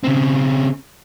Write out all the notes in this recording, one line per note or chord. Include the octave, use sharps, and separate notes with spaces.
C#3 C4